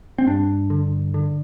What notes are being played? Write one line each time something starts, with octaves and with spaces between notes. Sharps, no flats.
C4
G2 D4
D3
D3